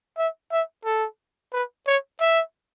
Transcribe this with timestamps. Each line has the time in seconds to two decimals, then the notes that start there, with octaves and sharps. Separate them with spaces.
0.18 E5
0.52 E5
0.85 A4
1.53 B4
1.87 C#5
2.20 E5